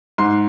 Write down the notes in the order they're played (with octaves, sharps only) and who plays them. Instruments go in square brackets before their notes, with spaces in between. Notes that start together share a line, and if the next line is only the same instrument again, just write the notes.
[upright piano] G#2 C6